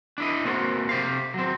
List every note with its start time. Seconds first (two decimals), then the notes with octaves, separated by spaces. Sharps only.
0.18 D4 E4 D#5
0.45 A#3 C4 F#4
0.89 C3 G4 F5
1.34 F#3 C4